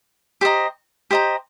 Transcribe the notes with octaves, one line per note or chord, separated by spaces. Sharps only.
G4 C5 D#5 A#5
G4 C5 D#5 A#5